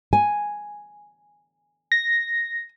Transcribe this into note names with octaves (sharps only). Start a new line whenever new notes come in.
G#5
A#6